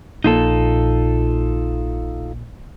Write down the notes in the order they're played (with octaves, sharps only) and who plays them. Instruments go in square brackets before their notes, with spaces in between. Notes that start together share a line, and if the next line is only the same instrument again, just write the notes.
[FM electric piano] A#1 A#2 [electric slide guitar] D#4 F4 A4